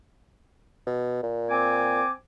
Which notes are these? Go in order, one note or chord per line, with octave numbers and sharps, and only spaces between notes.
B2
A#2
C4 G#5 D6